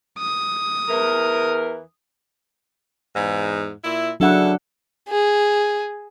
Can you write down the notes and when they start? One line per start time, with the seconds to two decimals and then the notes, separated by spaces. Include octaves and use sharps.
0.18 D#6
0.89 E2 E3 A#4
3.15 E2 G#2
3.84 A#2 E4
4.20 C#3 F#3 D4 E4 A4 F#5
5.09 G#4